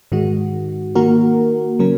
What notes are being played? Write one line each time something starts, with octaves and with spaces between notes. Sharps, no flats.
G#2 D#3 G#3 F#4
D#3 A#3 F#4 A#4
C#3 F#3 C#4 A#4